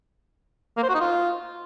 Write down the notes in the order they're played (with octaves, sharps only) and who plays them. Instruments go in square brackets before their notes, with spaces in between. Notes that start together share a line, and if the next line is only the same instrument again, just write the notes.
[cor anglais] A#3
C5
F#4
D#4
F4